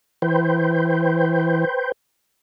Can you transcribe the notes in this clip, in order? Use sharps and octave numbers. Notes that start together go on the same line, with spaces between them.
E3 B4 C5 G5